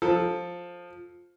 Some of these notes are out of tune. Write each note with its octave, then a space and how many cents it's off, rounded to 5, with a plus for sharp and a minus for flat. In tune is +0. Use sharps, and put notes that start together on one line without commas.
F3 +10 A4 +0